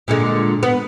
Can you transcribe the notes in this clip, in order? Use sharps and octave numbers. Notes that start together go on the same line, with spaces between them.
A#2 D3 G#3
B3